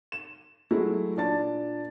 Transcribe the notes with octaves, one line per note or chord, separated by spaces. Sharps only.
E7
F#3 G#3 A3 E4
A#2 D4 D5 A5 A6